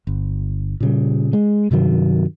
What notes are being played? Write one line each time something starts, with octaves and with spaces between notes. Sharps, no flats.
G1
A#2 C#3 G3
G#3
G2 C3 D#3 F#3